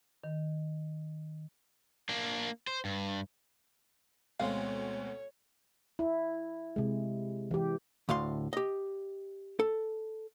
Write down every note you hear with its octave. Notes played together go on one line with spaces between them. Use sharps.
D#3
A#3 D4
C5
G2
D2 B2 G#3 C4 C#5 F5
E4
C3 G#3
E3 G4
D2 A2 F5 C6
G4 D#5
A4